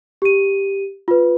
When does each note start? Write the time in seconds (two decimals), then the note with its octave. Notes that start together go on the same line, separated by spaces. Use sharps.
0.22 G4 D#7
1.08 F4 B4